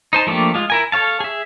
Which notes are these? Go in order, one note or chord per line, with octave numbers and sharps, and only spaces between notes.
D#4 C5 A5
F3 A3 A#3 D4 G4
G#3 F4
E4 A#4 G#5
A4 C#5 F5 A5
G#4 E5